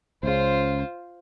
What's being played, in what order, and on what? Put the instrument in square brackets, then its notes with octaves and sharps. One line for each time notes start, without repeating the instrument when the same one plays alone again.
[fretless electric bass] C#2 C#3 [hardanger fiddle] F4 C5